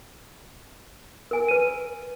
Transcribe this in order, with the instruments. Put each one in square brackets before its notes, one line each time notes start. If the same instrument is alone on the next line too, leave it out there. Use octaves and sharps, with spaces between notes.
[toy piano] A#4 G#5
[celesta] B4 D#7